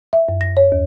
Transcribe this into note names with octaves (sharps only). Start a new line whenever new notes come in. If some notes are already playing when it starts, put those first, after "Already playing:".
E5
F#2
A#6
C#5
D#2